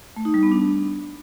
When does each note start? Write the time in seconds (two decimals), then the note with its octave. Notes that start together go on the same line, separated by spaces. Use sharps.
0.16 A3
0.25 D#4
0.34 G3
0.43 B3
0.52 D4